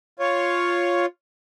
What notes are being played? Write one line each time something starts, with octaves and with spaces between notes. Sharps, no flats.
F4 C#5